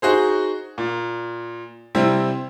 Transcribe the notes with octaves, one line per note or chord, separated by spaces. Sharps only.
D#4 F#4 G#4 C5
A#2
C3 G3 C4 E4